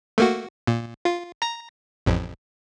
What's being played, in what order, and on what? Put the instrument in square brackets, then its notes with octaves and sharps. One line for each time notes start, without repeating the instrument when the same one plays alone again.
[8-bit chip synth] A3 A#3 F#4
A#2
F4
A#5 A#6
A1 F2